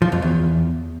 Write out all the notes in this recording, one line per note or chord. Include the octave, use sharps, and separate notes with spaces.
F3
F2
E2